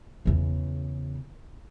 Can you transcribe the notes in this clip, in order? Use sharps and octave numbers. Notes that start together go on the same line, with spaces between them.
E2 C#3